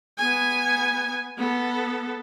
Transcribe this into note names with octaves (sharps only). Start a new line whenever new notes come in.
B3 G#5
B3 A4